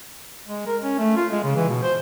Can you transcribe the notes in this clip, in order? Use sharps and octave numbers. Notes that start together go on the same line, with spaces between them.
G#3
A#4
C#4
A3
F4
G#3
C#3
E3
B2
C5